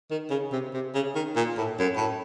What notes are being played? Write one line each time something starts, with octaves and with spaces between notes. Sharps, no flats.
D#3
C#3
C3
C3
C#3
D#3
A#2
A2
F#2
A2